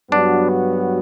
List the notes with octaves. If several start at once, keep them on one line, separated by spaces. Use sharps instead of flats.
G2 F#3 B3 D4 F#4